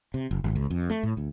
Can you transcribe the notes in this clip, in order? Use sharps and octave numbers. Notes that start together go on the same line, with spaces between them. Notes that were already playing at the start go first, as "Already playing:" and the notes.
C3
F#1
G#1
C#2
F2
A3
A2
D2